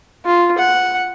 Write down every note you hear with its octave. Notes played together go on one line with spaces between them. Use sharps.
F4
F#5